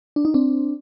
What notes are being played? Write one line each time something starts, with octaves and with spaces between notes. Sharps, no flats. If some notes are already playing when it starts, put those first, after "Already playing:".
D4
D#4
C4 D4